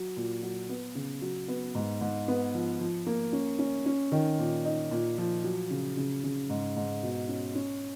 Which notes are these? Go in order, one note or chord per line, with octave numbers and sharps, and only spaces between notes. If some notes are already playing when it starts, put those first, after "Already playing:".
Already playing: F#3
A#2
F#3
B3
C#3
F#3
B3
G#2
G#2
B3
F3
F3
A#3
C#4
C#4
C#4
D#3
A#2
D#4
A#2
F3
F#3
C#3
C#3
C#3
G#2
G#2
B2
C#4
C#4